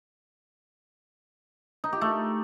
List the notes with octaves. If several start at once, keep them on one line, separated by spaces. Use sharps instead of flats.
D#4
G4
A3